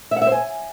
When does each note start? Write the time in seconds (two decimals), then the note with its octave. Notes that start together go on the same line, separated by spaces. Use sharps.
0.11 E5
0.16 F#5
0.22 E5
0.27 C5
0.32 G#5